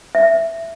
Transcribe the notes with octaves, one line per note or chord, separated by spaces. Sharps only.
E5